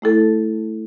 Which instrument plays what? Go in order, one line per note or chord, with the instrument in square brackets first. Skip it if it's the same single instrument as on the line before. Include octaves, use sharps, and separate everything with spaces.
[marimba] A3 E4 A4